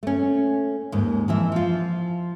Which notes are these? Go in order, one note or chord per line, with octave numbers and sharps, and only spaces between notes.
A3 C#4
D#2 G#2
F2 E3 E5
F3 F4